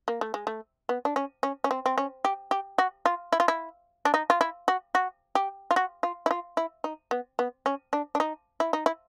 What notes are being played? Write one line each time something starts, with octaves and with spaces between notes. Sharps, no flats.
A#3
A3
G#3
A3
B3
D4
C#4
C#4
C#4
C4
C4
C#4
G4
G4
F#4
F4
E4
F4
E4
D4
D#4
F4
E4
F#4
F#4
G4
F4
F#4
F4
E4
F4
E4
D#4
B3
B3
C#4
D4
D4
D#4
E4
D#4
E4